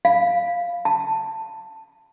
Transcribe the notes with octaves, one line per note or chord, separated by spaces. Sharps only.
F5
A5